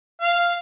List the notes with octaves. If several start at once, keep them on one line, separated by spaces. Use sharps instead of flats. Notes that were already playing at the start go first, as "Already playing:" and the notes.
F5